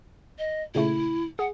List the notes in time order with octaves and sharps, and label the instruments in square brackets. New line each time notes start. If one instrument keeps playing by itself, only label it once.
[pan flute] D#5
[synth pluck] A#2 C#3 A3 [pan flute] E4
[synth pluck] G#4 [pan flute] F#5